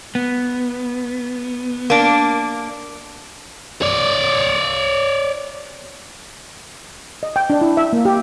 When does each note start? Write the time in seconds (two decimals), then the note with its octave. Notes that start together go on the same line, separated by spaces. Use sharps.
0.15 B3
1.90 A#3 D4
3.82 C#5 D5
7.23 D#5
7.36 G5
7.50 D4
7.61 E4
7.77 E5
7.93 A#3
8.05 G4